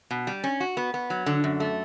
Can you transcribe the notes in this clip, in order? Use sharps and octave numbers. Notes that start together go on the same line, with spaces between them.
B2
G3
C#4
F#4
B3
B3
F#3
D3
F#2
A3